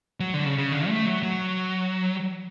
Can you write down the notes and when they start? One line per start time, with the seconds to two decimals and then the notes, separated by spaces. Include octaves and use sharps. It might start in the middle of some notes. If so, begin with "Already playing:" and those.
0.20 F#3
0.34 D3
0.46 C#3
0.58 C#3
0.72 D3
0.88 A3
1.06 F#3
1.23 F#3